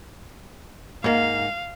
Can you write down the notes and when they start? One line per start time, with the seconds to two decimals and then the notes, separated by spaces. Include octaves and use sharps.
1.04 G#2 A#3 F5